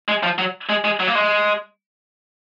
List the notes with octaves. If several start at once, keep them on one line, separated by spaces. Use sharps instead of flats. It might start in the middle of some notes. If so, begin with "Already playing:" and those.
G#3
F3
F#3
G#3
G#3
F#3
A#3
G#3